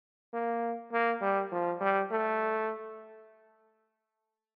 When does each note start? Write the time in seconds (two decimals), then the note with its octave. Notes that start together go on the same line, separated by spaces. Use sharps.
0.33 A#3
0.92 A#3
1.21 G3
1.52 F3
1.81 G3
2.11 A3